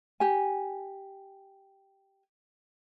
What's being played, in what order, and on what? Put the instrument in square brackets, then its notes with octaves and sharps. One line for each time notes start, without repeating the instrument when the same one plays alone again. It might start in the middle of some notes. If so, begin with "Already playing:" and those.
[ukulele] G4 G#5